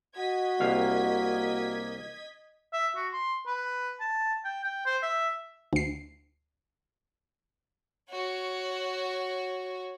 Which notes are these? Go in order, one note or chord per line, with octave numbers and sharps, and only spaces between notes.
F#4 D#5 G#6 B6
C2 A#3 F5
E5
F#4
C6
B4
A5
G5
G5
C5
E5
D2 C7
F#4 C#5